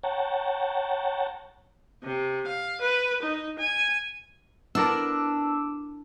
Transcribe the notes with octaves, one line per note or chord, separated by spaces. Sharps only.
C#5 F#5 G5 A5 A#5
C3
F5
B4
D#4
G#5
B3 D4 E4 A4 A#4 D6 E6